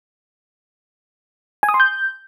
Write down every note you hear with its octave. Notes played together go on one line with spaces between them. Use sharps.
G#5
D#6
C6
G6